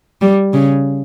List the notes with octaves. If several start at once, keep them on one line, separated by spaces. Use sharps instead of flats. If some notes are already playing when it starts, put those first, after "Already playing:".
G3
C#3